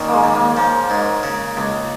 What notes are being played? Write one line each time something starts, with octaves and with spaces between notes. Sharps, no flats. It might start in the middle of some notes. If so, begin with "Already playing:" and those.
Already playing: A#2 D#3 C#4 A#4
G#3 A#3
D#2
A#3
F3
G#2
C#3
C#2